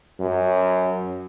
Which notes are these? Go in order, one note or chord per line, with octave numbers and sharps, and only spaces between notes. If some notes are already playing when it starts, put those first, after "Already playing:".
F#2